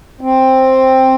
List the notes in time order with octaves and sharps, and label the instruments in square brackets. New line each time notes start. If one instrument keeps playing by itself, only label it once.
[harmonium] C4